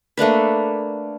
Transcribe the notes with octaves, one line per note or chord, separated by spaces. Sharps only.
A3 A#3 D4 B4